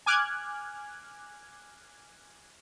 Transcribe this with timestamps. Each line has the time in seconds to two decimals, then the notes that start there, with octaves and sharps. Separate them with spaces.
0.06 G#5 D6 F6 F#6 G#6